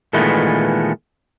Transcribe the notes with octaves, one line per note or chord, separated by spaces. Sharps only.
A#2 D#3 E3 G#3 A3 B3